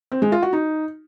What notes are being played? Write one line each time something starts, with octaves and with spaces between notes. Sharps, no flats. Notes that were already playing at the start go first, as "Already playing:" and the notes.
C4
G#3
F4
F#4
D#4